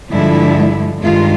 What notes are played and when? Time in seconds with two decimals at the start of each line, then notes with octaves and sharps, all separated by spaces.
0.11 G2 D3 F3 G#3 E4
1.01 G2 D#3 G#3 F4